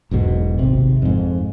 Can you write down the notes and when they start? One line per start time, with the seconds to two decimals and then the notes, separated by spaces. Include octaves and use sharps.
0.11 E1 B1 G#2 B2
0.59 G#1 C3
1.02 F2 G#2